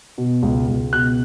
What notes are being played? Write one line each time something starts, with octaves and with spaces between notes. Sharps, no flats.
B2
C#2
C#2
B2 F#6